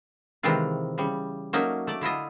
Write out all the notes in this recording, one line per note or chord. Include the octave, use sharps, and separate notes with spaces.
C3 D#3 E3 G#3 C4 F4
C#3 G3
F#3 A3 A#3 C#4 D#4
A3 D5
D3 E4 F4 D#5